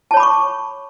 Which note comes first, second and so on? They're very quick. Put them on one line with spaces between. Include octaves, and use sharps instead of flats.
A5 C#5 B5 D6 C#6